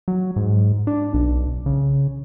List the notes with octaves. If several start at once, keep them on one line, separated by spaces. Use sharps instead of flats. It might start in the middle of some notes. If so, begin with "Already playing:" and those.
F#3
G#2
D4
B1
C#3